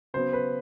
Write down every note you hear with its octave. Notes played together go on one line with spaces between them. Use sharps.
C#3 F#3 B3 C5
B4